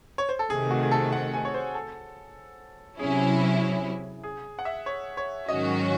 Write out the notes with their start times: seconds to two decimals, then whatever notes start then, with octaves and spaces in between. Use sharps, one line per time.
0.18 C#5
0.29 C5
0.39 A4
0.50 C3 D#3 A3 G#4
0.71 F#4
0.83 G#4
0.91 A4
1.12 F#5
1.34 G#5
1.45 C#5
1.54 C5
1.74 A4
2.99 C3 F#3 C#4 E4 G#4
4.24 G#4
4.59 F#5
4.65 E5
4.86 C#5
5.17 C#5
5.48 G#2 D#3 F#3 C#4 F#4 D#5